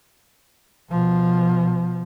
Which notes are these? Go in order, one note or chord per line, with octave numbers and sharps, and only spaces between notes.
B2 F3